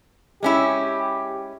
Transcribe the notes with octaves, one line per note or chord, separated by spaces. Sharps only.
G#3 C#4 E4 G4